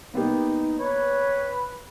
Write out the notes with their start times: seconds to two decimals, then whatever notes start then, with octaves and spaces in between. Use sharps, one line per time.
0.14 A#3 B3 D#4 G4
0.79 B4 C#5